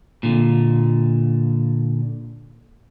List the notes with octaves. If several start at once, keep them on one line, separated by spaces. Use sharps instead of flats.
A#2 D3